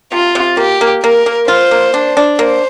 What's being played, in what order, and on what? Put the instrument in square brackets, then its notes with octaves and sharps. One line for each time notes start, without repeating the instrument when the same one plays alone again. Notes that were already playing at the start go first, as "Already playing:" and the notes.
[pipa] C3 [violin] F4
[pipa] C3
[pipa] A#3 [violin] G4
[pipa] A#3
[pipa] A#3 [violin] A#4
[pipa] A#3
[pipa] F4 [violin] C5
[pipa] A#3
D4
D4
[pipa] A#3 [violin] C5